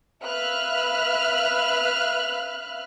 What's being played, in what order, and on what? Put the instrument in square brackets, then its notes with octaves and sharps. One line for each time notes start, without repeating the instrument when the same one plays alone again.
[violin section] B4 E5 F5 F6 F#6